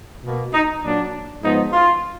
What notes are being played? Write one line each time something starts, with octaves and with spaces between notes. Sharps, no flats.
B2 A#3
D#4
A#2 F#3 A#3 D4
G#2 F3 B3 D#4
F4